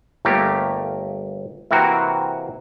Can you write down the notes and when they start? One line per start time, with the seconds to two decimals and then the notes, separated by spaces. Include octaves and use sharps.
0.25 G1 A3 A#3 G4
1.71 C3 E3 A#3 C4 F#4 A#4